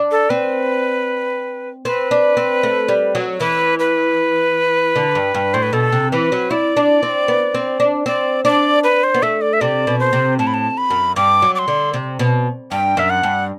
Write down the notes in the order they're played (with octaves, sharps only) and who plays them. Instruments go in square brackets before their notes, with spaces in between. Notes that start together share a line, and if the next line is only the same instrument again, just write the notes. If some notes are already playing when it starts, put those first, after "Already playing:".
Already playing: [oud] D4
[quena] A4
[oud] C4 [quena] B4
[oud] C4 [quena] B4
[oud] D4
C4
A3
G3
F#3
[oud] E3 [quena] B4
[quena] B4
[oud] D3
G2
G2
[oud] A2 [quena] C5
[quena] B4
[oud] B2 [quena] A4
[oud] C3
[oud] E3 [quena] B4
[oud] F#3
[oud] E4 [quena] D5
[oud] D4
C4
B3
C4
D4
[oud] C4 [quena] D5
[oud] D4 [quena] D5
[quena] B4
C5
[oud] B3
[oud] A3 [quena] E5
[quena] D5
E5
[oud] C3 [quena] D5
[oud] B2
[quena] C5
[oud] C3
[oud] A2 [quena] A5
[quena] B5
A5
B5
[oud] F#2
[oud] G2 [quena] D6
[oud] F#3
[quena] D6
C6
[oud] D3
C3
B2
[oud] G2 [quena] G5
[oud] F#2 [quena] E5
[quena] F#5
[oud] G2